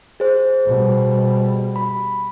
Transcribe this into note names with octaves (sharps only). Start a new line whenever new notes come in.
G#4 C5
B2 G3
B5